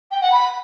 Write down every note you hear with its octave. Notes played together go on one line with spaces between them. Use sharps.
G5
F#5
B5